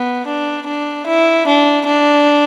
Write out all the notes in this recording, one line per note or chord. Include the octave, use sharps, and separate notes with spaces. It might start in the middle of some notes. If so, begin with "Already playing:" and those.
Already playing: B3
D4
D4
E4
D4
D4